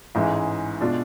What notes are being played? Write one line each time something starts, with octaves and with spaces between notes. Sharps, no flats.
A1 G#2 E3 G#3
B2 G#3 D4 F4